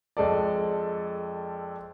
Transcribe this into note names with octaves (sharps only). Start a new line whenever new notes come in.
F2 G#3 A4 D5